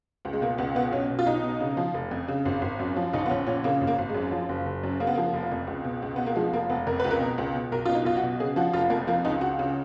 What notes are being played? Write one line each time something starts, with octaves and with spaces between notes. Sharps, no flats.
C#2
G#3
B2 A#3
C#2 B3
B2 B3
B1 C#4
B2
F4
B1 D#4
B2
C#3
F3
F1
F2
C#3
G#1
G#1
F#2
F3
A#1 D#4
B3
A#1 C#4
A#2 C#4
C#3 A#3
G#1
A#3
G#1
G#3
F#2
F3
F#1
F#1
F#2
C#3 A#3
B3
F3 A#3
F1
F2
C#2
B2
C#2
B2 B3
A#3
F3 G#3
F1 A#3
F1 B3
F2 A#4
C#2 B4
A#4
B2
C#2
B2
B1 A#4
B2 F4
D#4
B1 F4
F#4
B2
C#3 G#4
F3 F#4
F1 F4
F2 A#3
F3 A#3
C#2 D#4
C#2 F#4
C#3